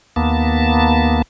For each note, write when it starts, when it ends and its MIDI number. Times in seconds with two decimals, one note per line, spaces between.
0.16 1.22 39
0.16 1.22 58
0.16 1.22 59
0.16 1.22 81